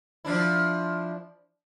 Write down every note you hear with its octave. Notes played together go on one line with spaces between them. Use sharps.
F3 D4 E4